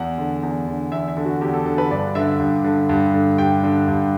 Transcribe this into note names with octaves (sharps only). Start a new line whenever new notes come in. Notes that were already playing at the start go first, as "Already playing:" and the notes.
Already playing: E2 F#5
D3
E2
D3
E2 E5
E5
D3
F#4
E2 G4
A4
D3 A4
B4
G2 D5
D3 E5
G2
D3
G2
D3
G2 G5
D3
G2